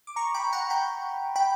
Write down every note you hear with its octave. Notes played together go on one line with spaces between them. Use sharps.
D6
A#5 C#6
G5 B5
F#5 A#5
G5 B5
G5 B5